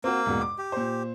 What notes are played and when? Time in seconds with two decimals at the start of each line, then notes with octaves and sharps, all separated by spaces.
0.04 A#3 C4 F#4
0.26 E1 G#2 B2
0.41 D6
0.58 G4
0.72 A#2 C5